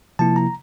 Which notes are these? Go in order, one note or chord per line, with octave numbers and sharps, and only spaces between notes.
C3 F3 A#3 E4 A5
A#5